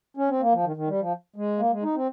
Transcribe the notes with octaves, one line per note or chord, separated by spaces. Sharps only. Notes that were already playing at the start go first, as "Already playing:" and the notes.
C#4
C4
A#3
F3
D#3
D#3
G3
F3
G#3
A#3
G#3
D#4
C4